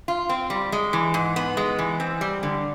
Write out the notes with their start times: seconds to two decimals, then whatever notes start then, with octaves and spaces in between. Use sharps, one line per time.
0.08 F4
0.29 C4
0.50 G3
0.72 G#3
0.93 E3
1.14 G#2
1.36 B3
1.57 G#3
1.79 E3
2.00 C4
2.21 G3
2.43 D3